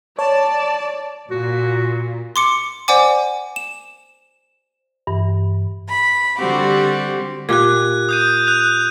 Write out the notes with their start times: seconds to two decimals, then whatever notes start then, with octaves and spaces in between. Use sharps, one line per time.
0.19 C#5 D5 A5
1.31 A#2 F#4
2.36 C6 D6 C#7
2.88 C5 D5 F#5 G#5 D6
3.56 E7
5.07 G2 E3
5.89 B5
6.39 D3 G3 C4 F#4 G4
7.49 A#2 G4 F#6 G#6
8.09 D#6 G6 D#7
8.47 F#6 F7